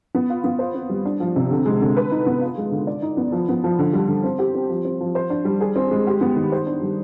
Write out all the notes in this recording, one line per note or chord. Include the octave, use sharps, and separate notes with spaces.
B3
F4
B3
C5
C4
G3
D4
F3
C3
D3
G#3
D3
B4
D#4
B3
F4
G#3
D3
D5
D#4
B3
F3
B3
F3
D3
G3
D3
C4
G4
C4
F3
C4
F3
C5
D4
G3
G#4
C4
G#3
G4
B3
D#3
C5
D4
G3